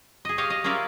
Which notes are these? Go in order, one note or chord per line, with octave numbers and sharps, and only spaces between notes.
G#4 D#5
G4 C#5 D#5 F5
D#5
A#3 C#4 F4 A#4 D5 E5